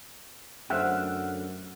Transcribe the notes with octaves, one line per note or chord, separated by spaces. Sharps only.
F#2 D3 A3 C5 E5 F#5 F6 F#6